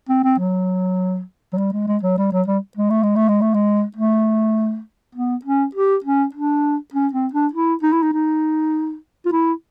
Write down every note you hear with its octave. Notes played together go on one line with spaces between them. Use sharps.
C4
C4
F#3
F#3
G3
G#3
G#3
F#3
G3
F#3
G3
G#3
A3
G#3
A3
G#3
A3
G#3
A3
B3
C#4
G4
C#4
D4
C#4
C4
D4
E4
D#4
E4
D#4
D#4
F4
E4